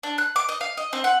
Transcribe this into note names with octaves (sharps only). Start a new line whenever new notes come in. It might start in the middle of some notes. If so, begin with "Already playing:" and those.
D4
F#6
D6
D#5
F5
D#5
C4
F#5